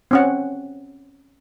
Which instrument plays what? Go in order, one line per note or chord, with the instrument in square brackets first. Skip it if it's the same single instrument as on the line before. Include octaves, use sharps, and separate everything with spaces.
[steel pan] C4 C#4 F#5